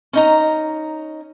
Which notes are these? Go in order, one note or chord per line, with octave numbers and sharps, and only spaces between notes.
C#4 D#4 A#5